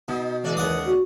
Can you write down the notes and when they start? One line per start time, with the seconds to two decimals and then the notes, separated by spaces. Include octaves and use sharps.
0.08 B2 D#4
0.44 C#3 E3 G#3 D5
0.57 D#2 F#5 D#6
0.85 F#4